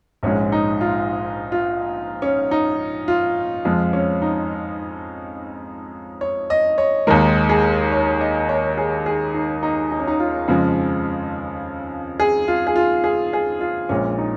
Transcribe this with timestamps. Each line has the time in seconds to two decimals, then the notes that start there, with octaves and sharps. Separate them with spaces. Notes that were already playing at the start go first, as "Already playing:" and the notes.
0.23 A#1 G#2 G#3 C#4
0.52 D#4
0.81 F4
1.52 F4
2.22 C#4
2.51 D#4
3.08 F4
3.65 F2 F3 G#3 F4
3.93 C#4
4.22 D#4
6.21 C#5
6.50 D#5
6.78 C#5
7.07 D#2 D#3 G#3 A#4
7.49 G#4
7.92 C#5
8.21 D#5
8.49 C#5
8.78 G#4
9.06 G#4
9.34 D#4
9.63 D#4
9.92 D#4
9.99 C#4
10.07 D#4
10.20 F4
10.48 F2 C#3 F3 G#3
12.20 G#4
12.48 F4
12.67 G#4
12.76 F4
13.04 G#4
13.33 G#4
13.61 F4
13.89 A#1 A#2 G#3 C#4
14.18 D#4